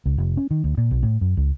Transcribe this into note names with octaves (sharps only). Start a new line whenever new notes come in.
C#2
F1
C#4
D#3
D2
A#2
B1
A2
F#2
C#2